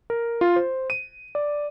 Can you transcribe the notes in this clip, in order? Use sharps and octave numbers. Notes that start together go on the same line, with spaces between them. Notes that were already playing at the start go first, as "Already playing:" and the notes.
A#4
F4
C5
D#7
D5